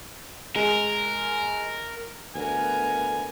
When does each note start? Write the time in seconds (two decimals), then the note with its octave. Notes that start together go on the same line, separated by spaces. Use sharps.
0.56 G#3 A#4
2.35 D2 B3 A#4 G#5